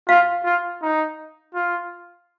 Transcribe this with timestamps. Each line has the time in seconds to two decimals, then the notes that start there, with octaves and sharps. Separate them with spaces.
0.08 F4 F5
0.45 F4
0.82 D#4
1.55 F4